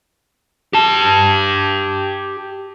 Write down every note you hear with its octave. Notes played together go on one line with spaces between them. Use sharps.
G4 A5